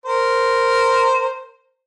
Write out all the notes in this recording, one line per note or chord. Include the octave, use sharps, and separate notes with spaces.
A#4 C5